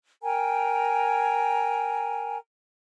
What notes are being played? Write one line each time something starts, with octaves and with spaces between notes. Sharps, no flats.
A#4 G5 G#5 A#5